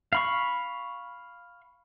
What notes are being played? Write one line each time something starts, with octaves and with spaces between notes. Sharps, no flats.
F5 B5 C#6